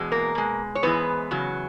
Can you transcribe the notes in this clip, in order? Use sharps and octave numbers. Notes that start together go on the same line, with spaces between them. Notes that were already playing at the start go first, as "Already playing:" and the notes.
Already playing: E2 B2 G#3
A#3 A#4
B2 G#3
C#5
G#2 E3 G#3 B3 B4
E2 C#3 F#3